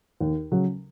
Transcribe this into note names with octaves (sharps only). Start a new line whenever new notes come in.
D#2
C#3 F#3